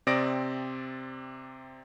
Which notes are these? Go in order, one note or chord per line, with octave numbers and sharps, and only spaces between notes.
C3 C4 D5 D#6 A#6 D7